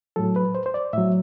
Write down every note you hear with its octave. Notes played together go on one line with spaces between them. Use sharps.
A2 F#3 A4
B4
C5
C5
D5
A2 F#3 E5